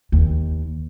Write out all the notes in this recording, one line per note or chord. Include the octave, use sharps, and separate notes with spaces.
D#2